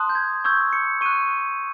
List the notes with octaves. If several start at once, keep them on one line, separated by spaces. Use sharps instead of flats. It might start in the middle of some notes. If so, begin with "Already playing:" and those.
Already playing: A5 C6 D#6 F#6
G6
G#6
C#6 E6 G6 G#6
C#7
C#6 F#6 D#7